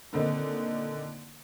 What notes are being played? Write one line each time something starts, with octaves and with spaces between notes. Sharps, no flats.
A#2 D3 D#3 C4 D#4